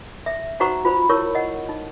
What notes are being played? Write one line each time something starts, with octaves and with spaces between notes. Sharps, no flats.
E5
D#4 F#4 C5 F#5 A#5 C#6
F4 C5 B5
E4 A#4 C#5 C#6
D#5 F#5
D#4